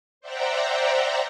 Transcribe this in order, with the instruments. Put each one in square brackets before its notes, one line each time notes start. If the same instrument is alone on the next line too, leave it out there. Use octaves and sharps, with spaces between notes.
[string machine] C5 D5 E5 F#5 G5 A#5